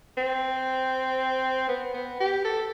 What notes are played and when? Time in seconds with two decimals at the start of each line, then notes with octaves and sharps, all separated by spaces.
0.17 C4
1.69 B3
1.94 B3
2.20 G4
2.45 A4